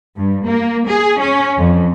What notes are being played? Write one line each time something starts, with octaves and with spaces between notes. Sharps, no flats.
G2
A#3
G#4
C#4
F2